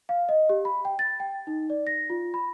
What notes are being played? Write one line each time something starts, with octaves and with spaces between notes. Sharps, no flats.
F5
D#5
G4
B5
G5
A6
G5
D#4
D5
A#6
F4
B5